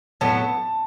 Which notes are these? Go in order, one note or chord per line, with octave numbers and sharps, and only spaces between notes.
A2 F#3 B3 A5